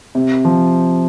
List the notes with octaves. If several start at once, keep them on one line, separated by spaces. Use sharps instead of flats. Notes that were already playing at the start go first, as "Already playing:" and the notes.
C3
F3